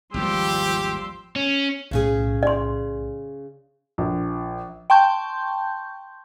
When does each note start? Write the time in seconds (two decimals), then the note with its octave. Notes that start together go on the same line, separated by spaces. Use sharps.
0.14 G#1 D#2 G#2 F3 G3 G4 C6 E6
1.36 C#4
1.91 B1 A2 C#3 C#4 G#4
2.43 D5 C6
3.98 A#1
4.90 G5 A5 C6 C#6 G6